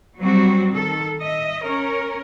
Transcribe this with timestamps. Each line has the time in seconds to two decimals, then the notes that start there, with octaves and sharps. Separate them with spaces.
0.21 F#3 G3 C4 F#4
0.74 D#3 A4
1.21 D#5 E5
1.64 C#4 A#4 C#5